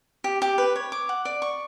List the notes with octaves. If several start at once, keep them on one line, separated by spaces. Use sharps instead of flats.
G4
G4
B4
C#5
D6
F#5
D5
C#6